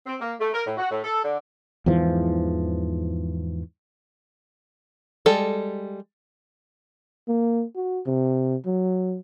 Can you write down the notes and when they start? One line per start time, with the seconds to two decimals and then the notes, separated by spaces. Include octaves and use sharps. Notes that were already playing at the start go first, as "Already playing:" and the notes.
0.06 C4
0.20 A#3
0.39 A3
0.53 A#4
0.65 A2
0.77 F#4
0.89 A2
1.04 A4
1.22 D3
1.86 E2 G#2 E3 F3
5.26 G3 G#3 A4
7.28 A#3
7.76 F#4
8.06 C3
8.66 F#3